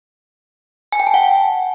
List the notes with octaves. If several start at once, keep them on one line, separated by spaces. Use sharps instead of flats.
G#5
G5
A5
F#5